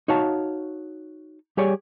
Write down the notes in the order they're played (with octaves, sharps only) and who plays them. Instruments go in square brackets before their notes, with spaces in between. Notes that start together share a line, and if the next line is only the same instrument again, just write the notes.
[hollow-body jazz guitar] D#4 F#4 C#5 F5 A5
G3 G4 G#4 C#5 D5